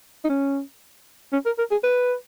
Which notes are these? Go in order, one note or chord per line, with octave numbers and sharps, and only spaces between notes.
D#4
C#4
C#4
A#4
A#4
G#4
B4